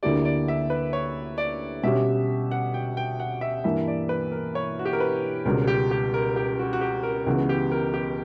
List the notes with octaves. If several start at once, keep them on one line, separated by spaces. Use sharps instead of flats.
D2 D3 A#3 E4 G4 D5
D5
E5
B4
C#5
D5
B2 G3 C#4 G4 E5
F#5
G5
G5
F#5
E5
G2 E3 A#3 D4 E5
D5
B4
A#4
C#5
F#4
G4
A#4
B4
C#2 B2 G3 C#4 A#4
G4
G4
A#4
G4
F#4
F#4
G4
A#4
C#2 C#3 E3 B3 F#4
G4
A#4
G4